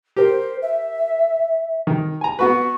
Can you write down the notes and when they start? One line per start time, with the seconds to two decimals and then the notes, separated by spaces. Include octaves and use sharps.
0.16 G4 A#4 C5
0.62 E5
1.87 D#3
2.21 G#5 A#5
2.39 B3 F#4 B4 C#6